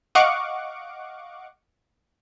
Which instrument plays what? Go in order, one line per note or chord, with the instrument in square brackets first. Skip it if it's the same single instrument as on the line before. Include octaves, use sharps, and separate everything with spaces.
[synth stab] D#5 F5 F#5 C#6 D6